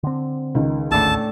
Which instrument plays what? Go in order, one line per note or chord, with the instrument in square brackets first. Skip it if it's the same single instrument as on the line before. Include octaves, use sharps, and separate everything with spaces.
[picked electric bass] D3 C4
[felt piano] C#2 D#3
[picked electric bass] G#1 D2 [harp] A2 D4 E6 [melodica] A5